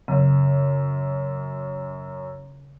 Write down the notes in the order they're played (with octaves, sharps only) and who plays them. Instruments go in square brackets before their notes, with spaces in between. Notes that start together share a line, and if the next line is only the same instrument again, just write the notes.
[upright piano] F#2 [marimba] C#3